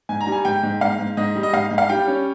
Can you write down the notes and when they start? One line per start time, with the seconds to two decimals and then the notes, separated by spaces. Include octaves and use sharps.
0.09 G#2 G#5
0.21 A#5
0.27 G3
0.32 G#5
0.45 G#2 G5
0.63 G#2
0.81 G#2 F5
0.99 G#2
1.17 G#2 D#5
1.36 G3
1.43 D#5
1.53 G#2 F5
1.71 G#2
1.78 F5
1.89 G3 G5
2.08 C#4